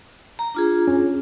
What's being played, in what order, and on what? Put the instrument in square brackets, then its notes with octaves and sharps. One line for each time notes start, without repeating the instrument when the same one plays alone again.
[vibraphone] A#5
D4 F4 G#4
[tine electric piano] C#4